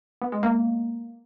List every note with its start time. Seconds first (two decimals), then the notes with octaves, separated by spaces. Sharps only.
0.22 B3
0.32 G#3
0.43 A#3